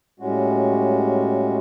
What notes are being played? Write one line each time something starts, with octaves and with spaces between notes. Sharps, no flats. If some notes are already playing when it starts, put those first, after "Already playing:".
A2 G3 G#3 C#4 F#4